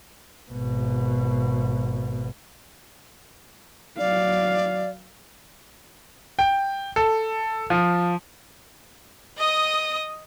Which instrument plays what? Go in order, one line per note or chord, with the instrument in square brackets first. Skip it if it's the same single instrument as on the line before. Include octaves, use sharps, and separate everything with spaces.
[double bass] G#1 B2
[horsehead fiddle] F#3 F5 [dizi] D5
[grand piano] G5
A4
F3
[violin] D#5 D#6